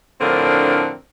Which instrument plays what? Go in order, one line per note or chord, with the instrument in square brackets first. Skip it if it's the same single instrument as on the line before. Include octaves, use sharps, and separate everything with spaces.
[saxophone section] A2 D3 F3 C4 D4 A#4